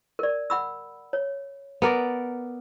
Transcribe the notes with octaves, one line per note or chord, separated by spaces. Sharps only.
A#4 D5
F#5 B5 E6
C#5
B3 A#4 D5